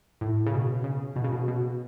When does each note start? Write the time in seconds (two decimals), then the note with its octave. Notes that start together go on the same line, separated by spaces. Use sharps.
0.21 A2
0.46 C#3
0.54 B2
0.84 C#3
1.16 B2
1.24 C#3
1.33 B2
1.48 B2